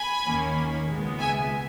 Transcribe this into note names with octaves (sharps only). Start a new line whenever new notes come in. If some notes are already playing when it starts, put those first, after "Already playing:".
Already playing: G#5 B5
D#2 D#3 A#3 C#4
C#2 B2 G#3 B3
E5 G#5